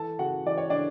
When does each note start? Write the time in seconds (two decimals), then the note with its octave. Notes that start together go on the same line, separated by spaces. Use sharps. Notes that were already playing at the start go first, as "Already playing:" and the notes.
Already playing: E3 A4 A5
0.19 C#3 F#4 F#5
0.45 E3 D5
0.58 C#5
0.70 C#3 D4 D5